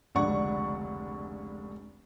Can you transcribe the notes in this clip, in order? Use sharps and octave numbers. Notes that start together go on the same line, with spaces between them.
F1 C#2 D3 D5 F#5 C#6